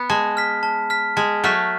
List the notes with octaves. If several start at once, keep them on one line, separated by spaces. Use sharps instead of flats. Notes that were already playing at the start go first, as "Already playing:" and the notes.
Already playing: B3
G#3 A5
F6 B6
A5
F6 B6
G#3 A5
F#3 A3 F6 B6